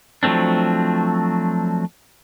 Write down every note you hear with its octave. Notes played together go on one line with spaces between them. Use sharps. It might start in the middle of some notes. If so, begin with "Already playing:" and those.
F3 F#3 A3 C4 D4